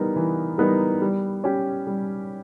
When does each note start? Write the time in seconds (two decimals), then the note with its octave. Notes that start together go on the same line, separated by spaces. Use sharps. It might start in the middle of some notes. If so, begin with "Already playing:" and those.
Already playing: E3 G3 B3 D#4 A#4
0.16 E3
0.58 G3 B3 D#4 A#4
1.01 G3
1.44 C#4 G4
1.87 G3